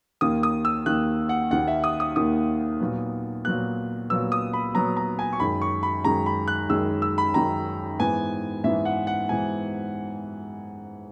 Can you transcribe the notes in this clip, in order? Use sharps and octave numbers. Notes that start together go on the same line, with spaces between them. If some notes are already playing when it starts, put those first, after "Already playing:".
D#2 D#3 A#3 D#6
D#6
E6
D#2 D#3 A#3 F#6
F#5
D#2 D#3 A#3 F#5
E5
D#6
D#6
D#2 D#3 A#3 D#6
A#2 F#3 B3
A#2 F#3 B3 F#6
A#2 F#3 B3 E6
D#6
B5
A#2 F#3 B3 A#5
A#5
G#5
C#6
F#2 D#3 G#3 B5
C#6
B5
F#2 D#3 G#3 A#5
B5
F#6
F#2 D#3 G#3 E6
E6
B5
F#2 D#3 G#3 A#5
G#2 E3 B3 G#5
G#2 E3 B3 E5
F#5
F#5
G#2 E3 B3 G#5